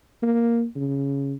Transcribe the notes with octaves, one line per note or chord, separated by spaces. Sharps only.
A#3
C#3